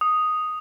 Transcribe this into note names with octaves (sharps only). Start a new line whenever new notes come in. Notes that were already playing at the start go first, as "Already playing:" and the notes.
D#6